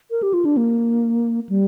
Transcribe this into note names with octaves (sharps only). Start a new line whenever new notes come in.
A#4
G4
F4
D4
A#3
G3